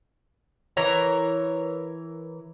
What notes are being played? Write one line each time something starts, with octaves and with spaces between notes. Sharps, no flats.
E3 A#4 C#5 A#5